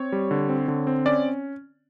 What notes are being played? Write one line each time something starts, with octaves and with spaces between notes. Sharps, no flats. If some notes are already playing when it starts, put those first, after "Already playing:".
Already playing: C4 C#5
G3
D3
C4
D3
C4
C#4 D5